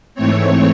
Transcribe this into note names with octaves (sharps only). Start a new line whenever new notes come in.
G#2 E3 A3 C4 C#5